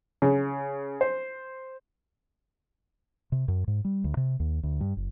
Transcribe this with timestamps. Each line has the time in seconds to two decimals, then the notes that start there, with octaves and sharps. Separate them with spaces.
0.22 C#3
1.01 C5
3.32 C3
3.48 F#2
3.67 G#2
3.85 G3
4.04 D2
4.17 C3
4.40 D#2
4.63 D2
4.81 G2
4.97 F#1